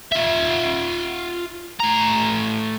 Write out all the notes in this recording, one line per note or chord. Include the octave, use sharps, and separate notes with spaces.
F4 E5
A2 A#5